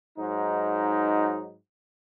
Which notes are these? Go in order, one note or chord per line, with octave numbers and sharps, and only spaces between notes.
G#2 F#3 D#4